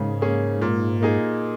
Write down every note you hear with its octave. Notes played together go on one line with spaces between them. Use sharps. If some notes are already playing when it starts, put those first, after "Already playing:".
Already playing: G#2 C#3 A#3 C#4 G#4
A#3 C#4 G#4
A#2
A#3 D#4 G#4